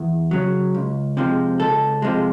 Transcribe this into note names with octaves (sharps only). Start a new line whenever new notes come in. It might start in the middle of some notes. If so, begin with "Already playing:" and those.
Already playing: E2
C#3 F#3
C#2
C3 F3 G#3
C#2 A4
C3 F3 G#3